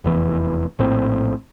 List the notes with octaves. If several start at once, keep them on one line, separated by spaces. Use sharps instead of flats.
F1 E2 E3
A#1 A2 C4